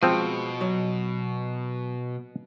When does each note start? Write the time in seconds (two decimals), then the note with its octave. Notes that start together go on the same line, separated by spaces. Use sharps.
0.03 B2 F3 G#3 C4
0.61 F#3